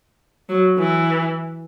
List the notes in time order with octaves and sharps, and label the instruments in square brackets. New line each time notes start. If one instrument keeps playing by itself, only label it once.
[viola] F#3
E3